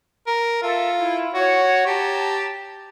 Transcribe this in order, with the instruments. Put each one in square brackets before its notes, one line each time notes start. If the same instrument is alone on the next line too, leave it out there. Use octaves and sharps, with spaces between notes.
[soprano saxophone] A#4
[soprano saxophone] F4 [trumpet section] A4 E5
[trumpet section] E4
[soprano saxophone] F#4 [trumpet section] C#5
[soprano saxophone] G4 [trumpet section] A5 A#5